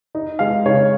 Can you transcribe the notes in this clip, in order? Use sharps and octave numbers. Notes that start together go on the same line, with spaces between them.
D#4
G#3 F5
C#3 C#5